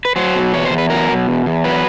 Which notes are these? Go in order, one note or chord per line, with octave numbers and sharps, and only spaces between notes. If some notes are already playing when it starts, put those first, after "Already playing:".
B4
F#3 C5
B2
E2 C#5
C5
E2
B4
F#3 A#4
B2
E2
E2
F#3 B4